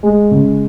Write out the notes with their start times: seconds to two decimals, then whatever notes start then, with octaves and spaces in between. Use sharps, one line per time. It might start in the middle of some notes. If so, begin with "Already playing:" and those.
0.03 G#3
0.31 C#3